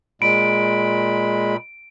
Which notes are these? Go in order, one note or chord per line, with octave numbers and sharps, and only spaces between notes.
A#2 G#3 B5 D7